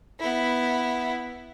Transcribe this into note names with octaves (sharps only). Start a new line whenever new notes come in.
B3 E4